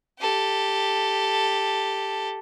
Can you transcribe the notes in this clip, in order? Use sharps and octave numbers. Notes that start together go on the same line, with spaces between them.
G4 A4